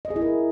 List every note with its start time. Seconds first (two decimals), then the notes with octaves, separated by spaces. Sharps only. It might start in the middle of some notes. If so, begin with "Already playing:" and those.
0.05 D#5
0.10 G#4
0.16 E4
0.22 A#4